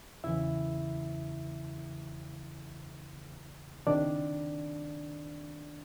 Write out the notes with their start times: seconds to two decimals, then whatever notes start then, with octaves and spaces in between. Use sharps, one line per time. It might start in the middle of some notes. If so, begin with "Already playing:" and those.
0.24 E2 C#3 E3 E4 E5
3.87 C#2 C3 D#3 D4 D5